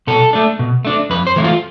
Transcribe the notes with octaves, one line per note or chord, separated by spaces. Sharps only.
B2 A4
A3 D4
B2
A3 D4
F2 B4
C5
E3 A3 E4
F4